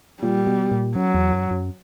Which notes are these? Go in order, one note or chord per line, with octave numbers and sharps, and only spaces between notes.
A#2 G3
B2
A#2
F#2 F#3
E2
F#2
F#2